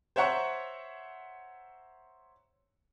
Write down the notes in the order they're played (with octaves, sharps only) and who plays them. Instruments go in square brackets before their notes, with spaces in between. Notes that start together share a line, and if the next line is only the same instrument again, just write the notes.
[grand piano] C5 C#5 E5 F#5 A#5 C#6